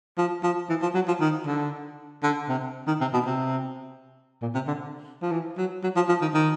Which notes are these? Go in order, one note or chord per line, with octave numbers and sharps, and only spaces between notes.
F3
F3
E3
F3
F#3
F3
D#3
D3
D3
C3
D#3
C3
B2
C3
A#2
C3
D3
F3
E3
F#3
F#3
F3
F3
D#3
D#3